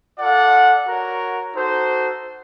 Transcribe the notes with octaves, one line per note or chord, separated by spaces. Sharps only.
F4 A4 D5 F#5
F#4 A#4 C#5
D#4 F#4 A4 C5